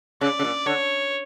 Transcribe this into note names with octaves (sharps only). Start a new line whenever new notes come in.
C#3 D5
C#3
A#2
D3 C#5